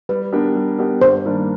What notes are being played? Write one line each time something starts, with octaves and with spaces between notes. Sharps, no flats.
G3 B4
B3 D4 G4 A#4
G3
B3 D4 G4 A#4
G2 C5
D#3 G3 A#3 D4